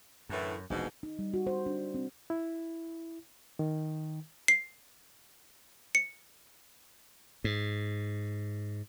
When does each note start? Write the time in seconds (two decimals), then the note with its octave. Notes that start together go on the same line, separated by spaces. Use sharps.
0.29 F#2 A2 D3 E3
0.70 E1 A#1 G#2 B2
1.03 D#4
1.19 G3
1.34 F#4
1.47 C5
1.66 D4
1.94 C4
2.30 E4
3.59 D#3
4.48 C7
5.95 C#7
7.44 G#2